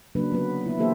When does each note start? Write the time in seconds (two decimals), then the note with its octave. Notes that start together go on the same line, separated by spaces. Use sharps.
0.15 C#3 F#3 A#3 D4 B4
0.32 D3 F#3 B3 B4
0.66 B3 E4
0.78 E3 A#3 G4 A4 C5 E5